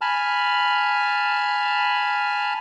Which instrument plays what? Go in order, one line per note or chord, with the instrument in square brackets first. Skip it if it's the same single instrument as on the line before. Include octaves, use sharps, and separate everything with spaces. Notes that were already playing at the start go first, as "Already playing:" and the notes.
[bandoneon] G#5 A5 B5 F6